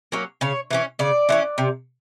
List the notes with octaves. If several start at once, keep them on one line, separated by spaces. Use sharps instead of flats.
F#3 A#3 C#4
C#3 C#5
E3 A3 C#4
C#3 D5
E3 A3 C#4
C3